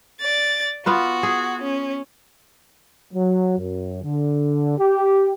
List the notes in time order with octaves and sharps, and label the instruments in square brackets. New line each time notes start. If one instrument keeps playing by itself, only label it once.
[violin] D5 A6
[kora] B3 F4 B4 [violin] F#4
[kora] G#4
[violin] C#4
[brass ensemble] F#3
F#2
D3
G4